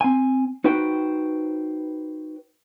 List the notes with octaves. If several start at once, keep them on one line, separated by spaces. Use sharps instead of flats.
C4 G#5
D#4 F#4 B4 C5 G5